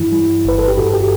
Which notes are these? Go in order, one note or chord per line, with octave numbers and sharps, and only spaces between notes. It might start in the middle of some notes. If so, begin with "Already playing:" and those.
Already playing: G2 E3 E4
G3
G1 B4
A4
G4
G2 F#4
A4
G4